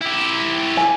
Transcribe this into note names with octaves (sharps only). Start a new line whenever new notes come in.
E4 G4
G#5